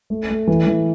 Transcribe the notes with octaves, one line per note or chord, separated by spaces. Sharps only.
A3
A3
E3
E3